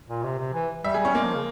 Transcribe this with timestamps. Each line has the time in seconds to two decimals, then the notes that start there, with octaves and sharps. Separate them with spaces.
0.09 A#2
0.24 C3
0.38 C3
0.54 E3
0.84 G3 E5
0.94 G#4
0.99 G3
1.05 C#4
1.14 G#3 A#3
1.24 F3
1.35 C#3